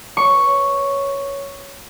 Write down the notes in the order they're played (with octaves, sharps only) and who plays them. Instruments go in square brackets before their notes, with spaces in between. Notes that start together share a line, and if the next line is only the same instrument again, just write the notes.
[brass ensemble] B4 C#5 [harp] C#6